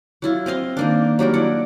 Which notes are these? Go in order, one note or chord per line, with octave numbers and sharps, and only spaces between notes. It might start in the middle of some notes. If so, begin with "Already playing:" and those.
F#3 E4 F4
C4 D#5 F5 C6
D#3 A#3 D4
F#3 G3 D4 A#4
E4 D5 F#5